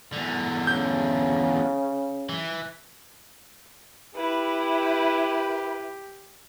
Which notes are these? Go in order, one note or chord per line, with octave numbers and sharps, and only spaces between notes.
E2 D3
C#3 G6
E3
E4 G4 B4